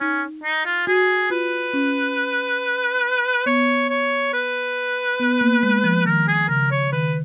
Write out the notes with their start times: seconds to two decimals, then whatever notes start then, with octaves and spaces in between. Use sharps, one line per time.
0.01 C#4 D#4
0.44 D#4
0.65 F4
0.87 F#4 G#4
1.30 F4 B4
1.74 C#4
3.46 B3 C#5
3.90 C#5
4.33 B4
5.20 B3
5.41 A#3
5.63 G#3
5.84 F3
6.06 D#3 A#4
6.28 G#4
6.49 C#3 A#4
6.71 C#5
6.92 D#3 B4